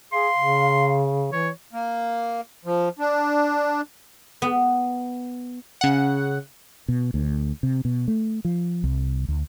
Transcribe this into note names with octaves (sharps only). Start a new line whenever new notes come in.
G#4 F5 C6
C#3
E3 C#5
A#3
F3
D4
B3
C#3 F#5
B2
D2
C3
B2
A3
F3
C2
D2